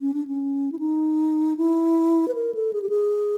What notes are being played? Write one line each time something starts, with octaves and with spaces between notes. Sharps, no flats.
C#4
D4
C#4
E4
D#4
E4
B4
A#4
A4
G#4
G4
G#4